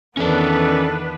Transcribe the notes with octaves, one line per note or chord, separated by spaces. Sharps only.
E2 D#3 B3 C#4 D4 A4 B4 D5